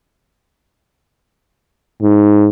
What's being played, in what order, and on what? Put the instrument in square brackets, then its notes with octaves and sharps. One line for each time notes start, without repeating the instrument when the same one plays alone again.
[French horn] G#2